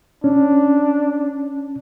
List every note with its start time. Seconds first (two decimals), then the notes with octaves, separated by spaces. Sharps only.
0.24 C#4 D4